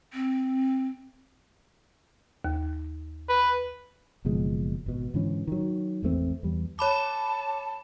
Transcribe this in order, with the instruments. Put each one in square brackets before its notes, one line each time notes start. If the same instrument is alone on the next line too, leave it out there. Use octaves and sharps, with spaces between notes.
[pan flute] C4
[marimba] D#2
[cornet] B4
[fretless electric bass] F#1 B2 F3 G#3
G#1 B2
G#2 D3 E3 C#4
D#3 F#3
G#1 E2 A3 C4
E2 G3
[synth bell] C#5 B5 D6 [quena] A5